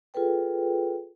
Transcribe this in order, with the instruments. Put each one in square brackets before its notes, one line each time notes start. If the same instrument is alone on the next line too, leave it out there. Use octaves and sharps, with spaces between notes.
[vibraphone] F4 G#4 A4 B4 G5